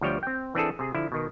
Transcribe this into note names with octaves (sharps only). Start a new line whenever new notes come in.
D2 F3 G3 C#5 G5
C4 G5
E3 C4 D4 E4 G#4 A4
C3 G#4
D3 F3 E4
B2 D#3